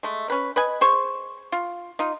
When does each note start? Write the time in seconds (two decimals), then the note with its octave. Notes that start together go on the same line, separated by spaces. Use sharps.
0.03 G#3 A3
0.30 C#4 B4
0.56 B4 D#5 G#5
0.81 G#4 C5 C#6
1.52 F4
1.99 D#4 F4